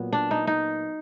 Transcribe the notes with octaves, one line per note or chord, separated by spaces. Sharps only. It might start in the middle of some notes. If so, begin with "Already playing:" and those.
Already playing: A#2 F#3 B3
D4
D#4
D#4